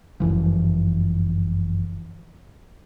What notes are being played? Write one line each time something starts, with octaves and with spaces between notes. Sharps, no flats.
G1 F#2 E3 F3